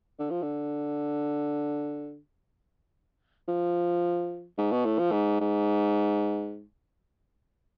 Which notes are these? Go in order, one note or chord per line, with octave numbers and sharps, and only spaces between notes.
D3
F3
D3
F3
G#2
B2
A2
F3
G#2
G#2